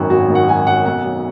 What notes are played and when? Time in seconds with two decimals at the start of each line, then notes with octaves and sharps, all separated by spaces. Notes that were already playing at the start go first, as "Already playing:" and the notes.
Already playing: G#1 F#2 D#3 F#3 F#4
0.10 G#1 F#4
0.30 D#3
0.35 F#5
0.48 F#3 G#5
0.67 F#2 F#5
0.86 B1 F#5
1.04 F#3